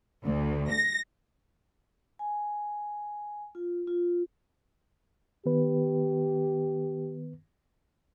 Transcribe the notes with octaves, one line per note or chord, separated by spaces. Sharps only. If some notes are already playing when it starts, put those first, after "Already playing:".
D2
A#6
G#5
F4
F4
D#3 B3 G4 B4